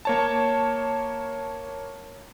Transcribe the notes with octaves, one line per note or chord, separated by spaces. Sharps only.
A#3 C#5 A5